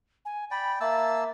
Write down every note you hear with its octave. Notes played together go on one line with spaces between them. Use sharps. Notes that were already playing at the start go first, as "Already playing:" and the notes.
G#5
D5 G5 B5
A#3 E5 A5 E6